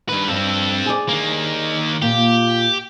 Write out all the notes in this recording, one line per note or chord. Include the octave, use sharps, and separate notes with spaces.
G2 D#3 B4
G2 C4 A4
G#4 D5
D#3 A#3
A#2 A#3 F4 G4